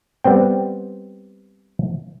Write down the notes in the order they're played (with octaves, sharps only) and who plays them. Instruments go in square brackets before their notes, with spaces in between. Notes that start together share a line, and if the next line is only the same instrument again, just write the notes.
[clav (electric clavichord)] G3 B3 C4 G5